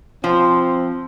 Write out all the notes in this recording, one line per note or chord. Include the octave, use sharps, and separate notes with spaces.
F3 C4 C6